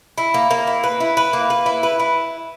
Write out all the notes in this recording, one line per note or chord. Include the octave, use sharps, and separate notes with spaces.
E4
A#3
A#3
E4
B4
E4
B4
A#3
B4
E4
B4
E4